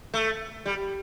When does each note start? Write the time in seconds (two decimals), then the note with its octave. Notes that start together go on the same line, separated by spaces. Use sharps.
0.14 A3
0.66 G3